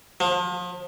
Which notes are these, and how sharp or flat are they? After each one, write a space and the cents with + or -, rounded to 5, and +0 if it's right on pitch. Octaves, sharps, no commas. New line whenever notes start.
F3 +35